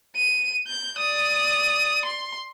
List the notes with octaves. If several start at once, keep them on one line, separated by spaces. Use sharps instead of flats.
D#7
G6
D5 D#6
C6